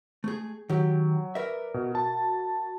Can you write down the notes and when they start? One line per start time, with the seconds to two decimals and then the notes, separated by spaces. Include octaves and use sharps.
0.24 A3 G#4
0.69 D#3 F#3 G4
1.35 A#4 B4 D5 E5
1.74 B2
1.92 F#4 A5